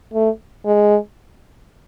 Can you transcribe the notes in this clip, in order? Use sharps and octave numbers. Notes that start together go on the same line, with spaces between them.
A3
G#3